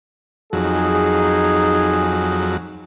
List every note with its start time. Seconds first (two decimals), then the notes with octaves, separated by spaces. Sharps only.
0.53 F2 F#3 D#4 G#4